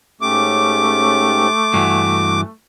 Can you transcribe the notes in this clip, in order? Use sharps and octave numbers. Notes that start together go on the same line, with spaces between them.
G#2 A3 C#4 G4 D6
G2 E3 F#4